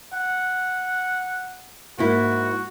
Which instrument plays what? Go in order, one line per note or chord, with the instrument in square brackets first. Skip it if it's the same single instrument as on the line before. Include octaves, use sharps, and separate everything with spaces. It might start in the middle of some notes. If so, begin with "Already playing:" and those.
[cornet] F#5
[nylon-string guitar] G#2 A#3 E4 [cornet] F#4